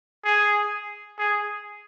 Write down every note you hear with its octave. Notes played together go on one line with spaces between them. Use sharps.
G#4
G#4